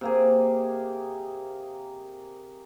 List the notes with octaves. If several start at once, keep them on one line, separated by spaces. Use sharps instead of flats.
C3 A#3 G#4